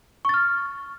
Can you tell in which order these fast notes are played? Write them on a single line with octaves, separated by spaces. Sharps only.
C#6 A6 F6